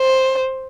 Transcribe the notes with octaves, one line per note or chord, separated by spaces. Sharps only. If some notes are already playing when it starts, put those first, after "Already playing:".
Already playing: C5